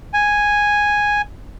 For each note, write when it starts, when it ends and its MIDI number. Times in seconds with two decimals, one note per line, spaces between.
0.14 1.22 80